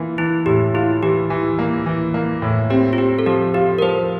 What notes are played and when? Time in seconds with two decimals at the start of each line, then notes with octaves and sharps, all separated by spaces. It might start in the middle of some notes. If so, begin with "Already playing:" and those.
Already playing: E3 A#3 F4
0.18 E3 E4
0.46 A2 G4
0.74 E4 F4
1.02 E3 G4
1.30 E3
1.59 A#3
1.86 E3
2.14 A#3
2.42 A2
2.70 C4 G4
2.93 F4
2.98 C4 G4
3.19 A4
3.26 F3 G4
3.54 F4 G4
3.79 A#4
3.82 F3 C5